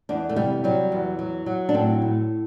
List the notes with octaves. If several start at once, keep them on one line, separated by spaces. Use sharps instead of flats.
E2 D4
A3
C3 G3
F#3 G3
E2
F#3
F#3
D4
A2 C4
A2